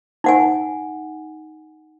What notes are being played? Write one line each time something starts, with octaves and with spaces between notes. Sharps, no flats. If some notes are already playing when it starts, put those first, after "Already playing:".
D#4 F#5 G#5